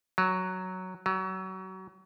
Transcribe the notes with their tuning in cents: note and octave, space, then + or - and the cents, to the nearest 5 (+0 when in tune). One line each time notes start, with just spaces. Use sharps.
F#3 +5
F#3 +30